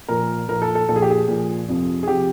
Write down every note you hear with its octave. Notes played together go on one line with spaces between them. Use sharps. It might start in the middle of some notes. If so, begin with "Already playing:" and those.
A#2 F3 A#4
A#2 F3 A#4
A4
A4
A#2 F3 A4
G#4
G4
G#4
A#2 F3
F2 C3 F3
G#4
C3 F3 G4